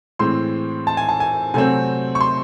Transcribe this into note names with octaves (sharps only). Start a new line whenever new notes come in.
A2 E3 G#3 C4 C6
A5
G#5
A5
G#5
C3 F#3 A3 C4 G#5
C#6
C6